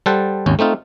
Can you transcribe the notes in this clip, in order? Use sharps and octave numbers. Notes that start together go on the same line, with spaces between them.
G3 A4 C5 F#5 A5
G#1 D#2 C#4
A3 C4 D#4 F4